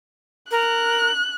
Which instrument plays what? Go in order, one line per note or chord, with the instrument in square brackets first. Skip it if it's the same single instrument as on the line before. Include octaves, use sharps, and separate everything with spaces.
[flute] A#4 [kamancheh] F#6